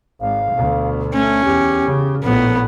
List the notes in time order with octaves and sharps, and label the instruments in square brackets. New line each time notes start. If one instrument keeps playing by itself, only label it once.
[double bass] G#1 [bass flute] F5
[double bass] D2 B2
[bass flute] A3 [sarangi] C#4
[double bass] E2 [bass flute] G4
[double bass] C#3
[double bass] A#1 A2 [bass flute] F3 [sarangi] B3